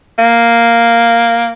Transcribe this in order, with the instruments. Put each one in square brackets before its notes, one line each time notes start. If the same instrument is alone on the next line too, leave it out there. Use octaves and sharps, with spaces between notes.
[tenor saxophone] A#3